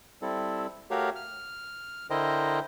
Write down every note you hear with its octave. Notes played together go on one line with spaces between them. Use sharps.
G3 C4 E4 A4
A3 F#4 G4 A#4 C#5 F5
F6
D3 E4 A#4 C5 D#5 G5